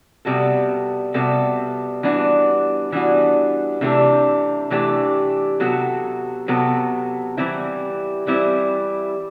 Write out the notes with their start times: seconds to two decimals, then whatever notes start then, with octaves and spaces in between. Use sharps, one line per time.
0.25 C3 G3 B3 F#4 A4
1.14 C3 G3 B3 F#4 A4
2.03 E3 G3 B3 D4 F#4
2.92 E3 G3 B3 D4 F#4
3.81 C3 E3 A3 D4 G4
4.70 C3 E3 A3 D4 G4
5.60 C3 F#3 B3 F#4 A4
6.48 C3 F#3 B3 F#4 A4
7.37 E3 G3 C4 E4
8.27 E3 G3 C4 E4